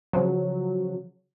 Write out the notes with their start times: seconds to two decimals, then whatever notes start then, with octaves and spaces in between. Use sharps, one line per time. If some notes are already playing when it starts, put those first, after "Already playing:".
0.13 C#3 F3 F#3